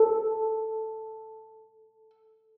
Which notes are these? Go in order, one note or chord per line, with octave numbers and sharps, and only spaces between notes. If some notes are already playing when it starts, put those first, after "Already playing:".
Already playing: A4